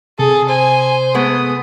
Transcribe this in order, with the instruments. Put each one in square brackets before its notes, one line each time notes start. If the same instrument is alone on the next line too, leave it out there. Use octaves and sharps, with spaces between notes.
[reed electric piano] C3 [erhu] G#4 [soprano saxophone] A4
[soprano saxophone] C5 [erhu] G#5
[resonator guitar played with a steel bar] G#3 A3 B3 [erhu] D#6